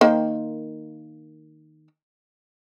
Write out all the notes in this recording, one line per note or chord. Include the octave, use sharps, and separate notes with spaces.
D#3 A#3 C5